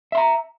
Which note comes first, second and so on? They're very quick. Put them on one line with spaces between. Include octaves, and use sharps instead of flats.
E5 C6 A#5